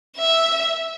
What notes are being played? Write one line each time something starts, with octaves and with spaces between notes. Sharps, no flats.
E5